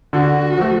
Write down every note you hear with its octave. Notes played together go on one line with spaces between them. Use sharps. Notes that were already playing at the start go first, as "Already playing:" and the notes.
D3 F#4
F3 A3